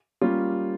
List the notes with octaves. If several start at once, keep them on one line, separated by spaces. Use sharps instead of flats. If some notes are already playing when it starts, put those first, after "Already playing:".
G3 A#3 C#4 F4